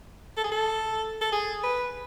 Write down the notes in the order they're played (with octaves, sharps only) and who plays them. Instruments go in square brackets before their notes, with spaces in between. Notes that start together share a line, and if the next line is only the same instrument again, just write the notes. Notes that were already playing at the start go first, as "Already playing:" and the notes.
[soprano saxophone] A4
G#4
A4
A4
G#4
B4